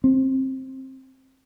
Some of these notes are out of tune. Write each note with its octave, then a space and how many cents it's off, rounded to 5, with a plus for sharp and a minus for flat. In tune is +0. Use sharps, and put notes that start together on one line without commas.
C4 +15